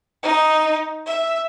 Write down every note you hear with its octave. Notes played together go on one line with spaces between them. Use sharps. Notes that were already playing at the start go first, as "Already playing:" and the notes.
D#4
E5